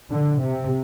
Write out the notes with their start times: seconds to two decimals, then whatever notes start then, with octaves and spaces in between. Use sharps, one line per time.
0.11 D3
0.41 C3